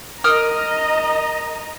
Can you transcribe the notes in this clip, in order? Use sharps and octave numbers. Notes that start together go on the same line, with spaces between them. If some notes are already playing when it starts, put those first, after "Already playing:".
A#4 D#5 A#5 D#6 F6